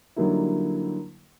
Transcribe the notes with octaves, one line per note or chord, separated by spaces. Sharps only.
D3 F#3 G3 A#3 D#4 E4